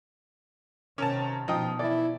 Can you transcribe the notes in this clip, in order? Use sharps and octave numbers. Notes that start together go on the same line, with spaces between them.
C3 D#3 C#4 A#4 A5
B2 F3 D#4 G5 D#6
E3 E4 D5